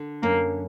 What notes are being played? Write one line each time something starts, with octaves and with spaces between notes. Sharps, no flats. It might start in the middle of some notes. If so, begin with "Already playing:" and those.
Already playing: D3
F#2 A#3